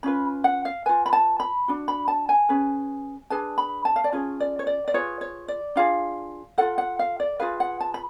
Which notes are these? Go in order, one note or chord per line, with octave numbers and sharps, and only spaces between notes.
C#4 F4 B4 B5
F#5
F5
F4 B4 G#5
B5
A5
B5
D4 F#4
B5
A5
G#5
C#4 G#4 B4
D4 G#4 B4 A5
B5
A5
F5
D5
C#4 F4 G#4 C#5
D5
C#5
D5
D5
F4 G#4 B4 C#5
C#5
D5
D4 F4 G#4 F5
F4 A4 F#5
F#5
F5
D5
F4 G#4 B4 F5
F#5
A5
B5